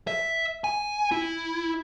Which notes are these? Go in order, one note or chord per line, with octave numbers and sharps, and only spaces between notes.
E5
G#5
E4